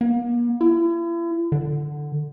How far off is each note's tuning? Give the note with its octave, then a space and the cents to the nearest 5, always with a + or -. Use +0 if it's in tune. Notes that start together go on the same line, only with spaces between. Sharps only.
A#3 +45
E4 +40
D3 +10